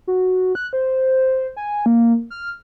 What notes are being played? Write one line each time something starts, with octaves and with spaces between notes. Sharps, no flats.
F#4
F#6
C5
G#5
A#3
F6